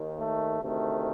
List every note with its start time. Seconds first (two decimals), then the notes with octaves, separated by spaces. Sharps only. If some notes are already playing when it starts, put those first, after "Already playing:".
Already playing: D#2 D#3
0.19 A3
0.62 D2 C3 D#3 A3